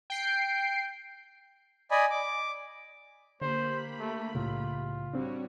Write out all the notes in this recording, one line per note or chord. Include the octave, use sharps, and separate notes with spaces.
G5 C7 D7
D5 D#5 G#5 B5
D6
D3 A#3 G4 C5 B5
A3
C2 A2 C#3 F4
G3 C4 D4 F#4 C#5